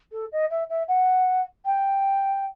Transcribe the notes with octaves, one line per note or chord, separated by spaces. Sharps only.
A4
D#5
E5
E5
F#5
G5